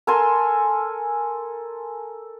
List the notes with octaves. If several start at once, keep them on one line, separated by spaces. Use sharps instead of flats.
A4 A#4 G#5 C6